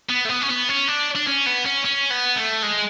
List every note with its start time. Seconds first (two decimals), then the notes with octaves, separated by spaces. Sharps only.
0.10 B3
0.25 A3
0.29 B3
0.42 C#4
0.49 B3
0.69 C#4
0.88 D4
1.15 D4
1.27 C#4
1.46 B3
1.65 C#4
1.85 C#4
2.10 B3
2.36 A3
2.63 G#3